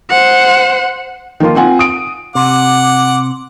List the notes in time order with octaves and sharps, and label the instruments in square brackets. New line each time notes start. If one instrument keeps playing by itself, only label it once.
[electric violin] C5 F#5
[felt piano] D#3 F3 A#3 F4
C4 F4 F#5 G#5
D#6 D7
[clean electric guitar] C3 [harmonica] F#5 [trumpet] D6